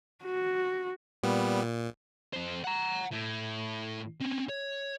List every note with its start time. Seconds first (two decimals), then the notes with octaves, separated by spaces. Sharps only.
0.24 F#4
1.23 A#2 G3 B3
1.62 A#2
2.33 F2 C5
2.64 F#5 A#5
3.11 A2
4.20 C4 C#4
4.49 C#5